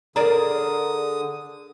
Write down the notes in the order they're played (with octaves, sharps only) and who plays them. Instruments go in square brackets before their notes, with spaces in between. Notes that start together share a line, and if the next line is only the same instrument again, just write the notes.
[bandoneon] D3 D#6 [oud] G#4 A#4 D5 [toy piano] A#5